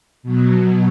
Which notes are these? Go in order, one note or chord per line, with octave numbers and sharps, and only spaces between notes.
B2 F#3